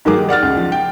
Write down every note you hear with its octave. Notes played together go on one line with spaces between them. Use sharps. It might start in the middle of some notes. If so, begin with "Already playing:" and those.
G#2 D#3 F#3 A#3 G#4 D6
G4
D5 F#5 F6 A6
C#2
F3
G5